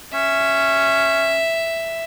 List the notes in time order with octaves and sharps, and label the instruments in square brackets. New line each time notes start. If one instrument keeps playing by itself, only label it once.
[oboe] C#4 [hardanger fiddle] E5